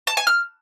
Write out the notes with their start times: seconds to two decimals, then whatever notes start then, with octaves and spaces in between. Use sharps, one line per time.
0.07 A5
0.17 G#5
0.27 F6